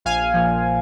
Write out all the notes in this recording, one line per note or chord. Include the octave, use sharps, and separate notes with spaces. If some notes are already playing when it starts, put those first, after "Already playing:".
A#1 F5 G#5
A#2 F3